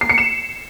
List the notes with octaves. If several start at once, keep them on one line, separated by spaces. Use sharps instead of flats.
C7
C#7
E7